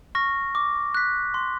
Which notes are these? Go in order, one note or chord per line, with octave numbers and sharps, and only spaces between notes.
C#6 F6 A#6
D6
F#6 B6
C6